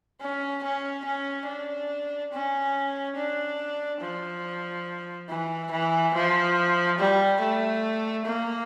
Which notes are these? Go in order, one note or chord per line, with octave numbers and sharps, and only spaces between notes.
C#4
C#4
C#4
D4
C#4
D4
F3
E3
E3
F3
G3
A3
A#3